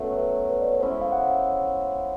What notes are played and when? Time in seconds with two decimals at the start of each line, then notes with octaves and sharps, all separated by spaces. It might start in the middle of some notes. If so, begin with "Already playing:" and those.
Already playing: B2 F#3 A3 C#4
0.16 B4
0.49 B4
0.61 D5
0.72 C#5
0.80 G#3 C#4 E4 C5
1.01 F5
1.12 F#5